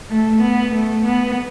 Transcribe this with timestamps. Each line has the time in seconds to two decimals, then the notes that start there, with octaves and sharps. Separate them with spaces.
0.11 A3
0.42 B3
0.75 A3
1.05 B3